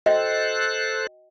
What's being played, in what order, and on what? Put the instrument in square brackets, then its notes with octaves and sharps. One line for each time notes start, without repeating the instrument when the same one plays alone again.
[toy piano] F#4 D#5 G5 [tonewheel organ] A4 C5 F#6